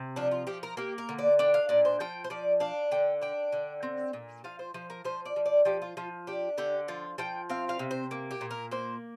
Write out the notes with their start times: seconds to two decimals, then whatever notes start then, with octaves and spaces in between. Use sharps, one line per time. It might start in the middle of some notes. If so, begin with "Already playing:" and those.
Already playing: C3
0.16 F3 D4
0.31 F4
0.47 F3 G4
0.63 A#4
0.77 A#3 G4
0.98 A#4
1.09 D3
1.19 D5
1.39 D4 G5
1.54 F5
1.69 A#2 D5
1.85 C5
2.00 F3 G5
2.24 C5
2.30 F3 D5
2.60 D4 F5
2.92 D3 G5
3.22 D4 G5
3.52 D3
3.83 C4
4.13 A#2
4.44 F3 F5
4.59 C5
4.74 F3 C5
4.90 A#4
5.04 F3 C5
5.25 D5
5.36 F3
5.46 D5
5.65 F3 G4
5.82 F4
5.97 F3 F4
6.27 D4 G4
6.58 D3 G4
6.88 F3 F4
7.18 F3 G5
7.50 C4 F5
7.69 F5
7.79 C3
7.91 C5
8.11 A#3
8.31 G4
8.41 A#2
8.51 A#4
8.71 A#3 C5